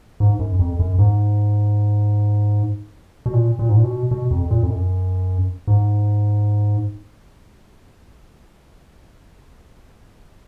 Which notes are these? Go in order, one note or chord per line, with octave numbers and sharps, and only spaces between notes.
G#2
F#2
F2
F#2
G#2
B2
A#2
A#2
G#2
A#2
B2
B2
F2
A#2
F2
F#2
G#2